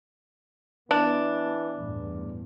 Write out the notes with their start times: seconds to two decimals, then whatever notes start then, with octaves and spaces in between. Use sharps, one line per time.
0.91 E3 B3 D4
1.77 A1 E2 G2